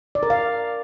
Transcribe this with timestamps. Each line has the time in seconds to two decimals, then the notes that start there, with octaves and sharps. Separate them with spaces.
0.15 D5
0.23 A#4
0.30 F5